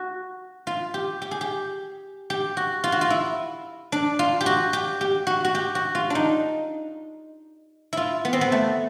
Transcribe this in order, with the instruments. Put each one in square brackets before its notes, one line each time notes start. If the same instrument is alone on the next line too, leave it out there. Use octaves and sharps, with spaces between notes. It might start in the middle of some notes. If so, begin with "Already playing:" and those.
Already playing: [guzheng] F#4
F4
G4
G4
G#4
G4
G4
F#4
F4
F#4
F4
E4
D4
F4
G4
F#4
G4
G4
F#4
F#4
G4
F#4
F4
D4 D#4
E4 F4
B3
C4
B3
A3